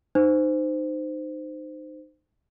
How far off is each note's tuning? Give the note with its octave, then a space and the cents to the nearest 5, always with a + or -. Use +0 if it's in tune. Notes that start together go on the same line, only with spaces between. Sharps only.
D#4 -25 C5 -20